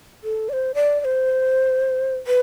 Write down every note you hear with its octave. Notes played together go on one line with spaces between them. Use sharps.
A4
D5
C5
D5
D5
C5
B4